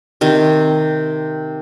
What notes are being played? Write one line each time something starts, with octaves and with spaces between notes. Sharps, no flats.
C3 D#3